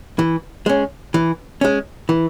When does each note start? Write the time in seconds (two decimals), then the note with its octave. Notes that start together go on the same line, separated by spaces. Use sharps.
0.19 E3
0.66 G#3 C#4
1.14 E3
1.61 G#3 C#4
2.09 E3